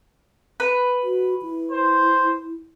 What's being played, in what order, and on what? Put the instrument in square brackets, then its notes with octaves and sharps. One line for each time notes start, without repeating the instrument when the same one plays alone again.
[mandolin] B4
[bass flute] F#4
E4
[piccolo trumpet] C5